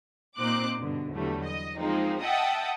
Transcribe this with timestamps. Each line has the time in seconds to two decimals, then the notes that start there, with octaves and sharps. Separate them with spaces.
0.37 A#2 C4 D#4 C5 D6 F#6
0.78 G2 B2 D3
1.12 E2 D3 F#3 G3 A3
1.43 D#5
1.77 F3 G#3 A#3 C4 D#4
2.21 D#5 E5 F#5 G5 A5 D#6